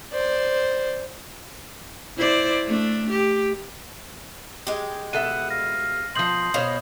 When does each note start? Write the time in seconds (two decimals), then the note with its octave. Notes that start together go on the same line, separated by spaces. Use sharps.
0.12 C5 D5
2.17 E4 C5 D5
2.66 A3 D4
3.11 G4
4.67 G#3 G4
5.13 B2 A4 E5 F#5 D#7
5.50 F5 A#6
6.16 B2 F3 C6 D#6 G6 F#7
6.54 B2 C5 C#5 F5